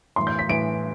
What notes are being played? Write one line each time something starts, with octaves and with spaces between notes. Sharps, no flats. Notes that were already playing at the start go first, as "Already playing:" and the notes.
A2 E3 C6
G6
B6
A2 E3 D7